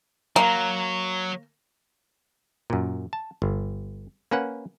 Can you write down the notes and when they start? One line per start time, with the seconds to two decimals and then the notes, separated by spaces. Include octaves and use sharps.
0.36 F#3 A#3
2.70 F#2 A#2
3.13 A5
3.42 G1
4.31 A#3 C#4 B4 F#5